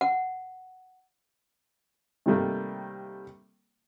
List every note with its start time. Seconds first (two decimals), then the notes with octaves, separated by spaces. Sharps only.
0.01 F#5
2.26 C3 D#3 G3 A3 A#3